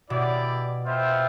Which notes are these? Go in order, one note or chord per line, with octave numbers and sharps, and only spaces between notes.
B2 E4 G4 D5
B3 F4 C5 E5 G5